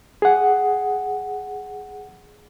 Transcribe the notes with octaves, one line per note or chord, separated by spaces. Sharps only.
G#4 F#5